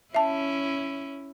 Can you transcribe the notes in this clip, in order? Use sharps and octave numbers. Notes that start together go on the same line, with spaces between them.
C#4 E4 E5 A5